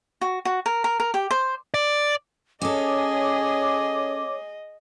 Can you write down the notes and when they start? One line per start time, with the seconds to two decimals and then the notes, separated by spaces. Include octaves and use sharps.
0.21 F#4
0.45 F#4
0.66 A#4
0.84 A#4
1.00 A#4
1.14 G4
1.31 C5
1.74 D5
2.62 C#4 G#4 A4 C#5 D#5 D6